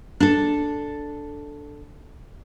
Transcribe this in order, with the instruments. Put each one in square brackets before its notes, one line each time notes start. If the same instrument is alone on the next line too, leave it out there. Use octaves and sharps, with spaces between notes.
[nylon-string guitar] D4 A4